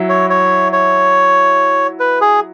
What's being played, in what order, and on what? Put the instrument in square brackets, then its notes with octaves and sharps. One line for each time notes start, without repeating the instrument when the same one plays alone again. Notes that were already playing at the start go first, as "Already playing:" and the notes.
Already playing: [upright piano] F#3 E4
[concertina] C#5
C#5
C#5
B4
G#4